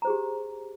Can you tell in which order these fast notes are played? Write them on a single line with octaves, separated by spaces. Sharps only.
A#5 C5 G#4 G4